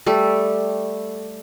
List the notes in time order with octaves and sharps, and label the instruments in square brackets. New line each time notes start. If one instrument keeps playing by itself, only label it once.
[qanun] G3 A3 A4